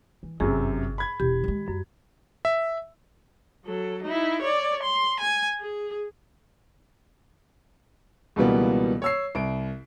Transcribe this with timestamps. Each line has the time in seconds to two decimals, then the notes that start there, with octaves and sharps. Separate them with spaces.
0.23 E3
0.40 G1 F#2 C3 D#4 G#4
0.98 B5 G#6
1.20 E1 G4
1.44 D#3 G#3
1.68 F#2 G3
2.45 E5
3.65 F#3 A4
4.03 D#4 E4
4.42 C#5 D5
4.84 C6
5.20 G#5
5.60 G#4
8.36 C#2 B2 E3 G3 A#3 B3
9.02 C#5 E6 C7
9.35 C2 D7